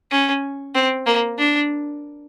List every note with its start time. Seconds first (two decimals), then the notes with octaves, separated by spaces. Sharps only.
0.11 C#4
0.75 C4
1.07 A#3
1.39 D4